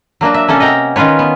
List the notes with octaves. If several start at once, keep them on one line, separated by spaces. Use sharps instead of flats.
F#3 A#3 D4 F#4
E5
C3 A#3 C#4 A4
D#5 F#5 G5 A#5
D#3 C#4 F4 B4 C#5
B3